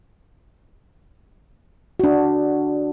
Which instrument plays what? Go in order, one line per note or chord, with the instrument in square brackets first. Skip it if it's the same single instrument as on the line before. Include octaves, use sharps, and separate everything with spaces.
[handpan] D4 F#4